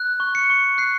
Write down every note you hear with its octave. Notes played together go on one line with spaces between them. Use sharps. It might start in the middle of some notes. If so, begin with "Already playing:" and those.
Already playing: F#6
C#6
C#7
C#6
F#6 C7